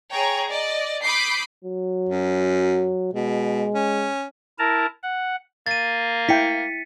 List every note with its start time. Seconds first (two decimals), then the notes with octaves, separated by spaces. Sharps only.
0.13 G#4 C#5 G5 A#5
0.49 D5 D#5
1.02 B5 D6 D#6 G6 B6 C7
1.64 F#3
2.09 F#2
3.14 B2 G#3
3.74 C#4
4.59 E4 A#4 A5 A#5
5.03 F#5
5.66 A#3 A6 D#7
6.29 E4 G5 B6 C#7